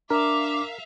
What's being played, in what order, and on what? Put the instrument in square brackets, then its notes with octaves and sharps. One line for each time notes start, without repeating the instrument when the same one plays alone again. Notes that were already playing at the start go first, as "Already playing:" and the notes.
[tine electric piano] D4 [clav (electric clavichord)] A#4 [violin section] E5 F5 [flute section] D6